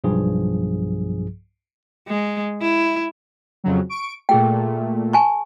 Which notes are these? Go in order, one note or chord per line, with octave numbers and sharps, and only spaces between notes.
B1 G2 F3 G#4
G#3
E4
F2 C#3 F#3
C#6 D7
A#2 A3 G#4 G5
G#5 A5 C#6